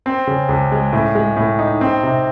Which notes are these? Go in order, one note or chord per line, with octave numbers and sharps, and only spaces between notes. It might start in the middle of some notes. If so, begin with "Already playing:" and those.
C4
C#3
C#2
G#3
A2
G#3
A2
D#4
C4
C3